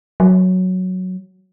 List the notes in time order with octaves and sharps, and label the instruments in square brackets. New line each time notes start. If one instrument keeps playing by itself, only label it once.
[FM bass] F#3